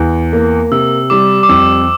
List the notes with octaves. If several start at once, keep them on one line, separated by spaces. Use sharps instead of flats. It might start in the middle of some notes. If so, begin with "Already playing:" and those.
Already playing: E2
A#3
C3 E6
G3 D6
D6
F2 E6